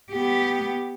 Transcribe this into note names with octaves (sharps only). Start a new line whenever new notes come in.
B3 G4